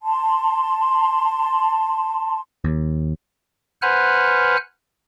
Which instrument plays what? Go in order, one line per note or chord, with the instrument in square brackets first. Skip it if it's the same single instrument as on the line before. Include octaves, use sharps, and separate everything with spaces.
[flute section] A5 C6
[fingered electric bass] D#2
[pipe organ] B4 C5 F#5 G#5 F6 F#6